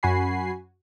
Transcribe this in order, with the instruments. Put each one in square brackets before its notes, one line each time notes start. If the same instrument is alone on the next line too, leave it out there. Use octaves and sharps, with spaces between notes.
[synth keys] F#2 F#4 G#5 B5 C7